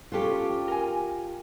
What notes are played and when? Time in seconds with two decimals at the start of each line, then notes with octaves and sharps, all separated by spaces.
0.12 C#4 F4 G4 A4 B4
0.68 A#4 G#5